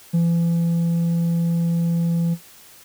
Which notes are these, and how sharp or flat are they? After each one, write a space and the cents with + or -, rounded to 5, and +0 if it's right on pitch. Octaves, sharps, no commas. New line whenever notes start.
E3 +40